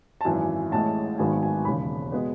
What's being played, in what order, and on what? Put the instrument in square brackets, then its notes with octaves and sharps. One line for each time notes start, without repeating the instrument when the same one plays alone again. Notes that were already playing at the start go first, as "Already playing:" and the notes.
[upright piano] A5
G#1 F#2 E3 G#5
A1 A2 G#3 A5
G#1 G#2 D#3 F#3 B3 G#5
G#5
E1 D#2 C#3 B5
B2 G#3 B3